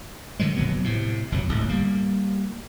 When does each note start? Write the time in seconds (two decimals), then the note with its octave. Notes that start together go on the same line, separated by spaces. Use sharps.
0.39 D3 D#3 F#3 G#3
0.56 F1 A#2 F#3 B3
0.84 A2 C3
1.32 F#1 F2 B2 F#3
1.49 D1 G#1 C#2 A2
1.69 G3 A#3